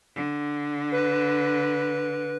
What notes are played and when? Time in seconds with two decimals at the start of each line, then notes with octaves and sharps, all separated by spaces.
0.15 D3
0.92 B4